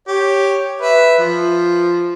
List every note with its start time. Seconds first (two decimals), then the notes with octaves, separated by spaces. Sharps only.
0.08 G4 C#5
0.81 B4 E5
1.19 F3